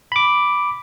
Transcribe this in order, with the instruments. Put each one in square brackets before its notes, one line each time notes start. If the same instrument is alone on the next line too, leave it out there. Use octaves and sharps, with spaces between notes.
[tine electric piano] B5 D6